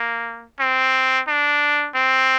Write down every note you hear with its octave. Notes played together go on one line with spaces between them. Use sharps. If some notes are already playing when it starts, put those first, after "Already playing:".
Already playing: A#3
C4
D4
C4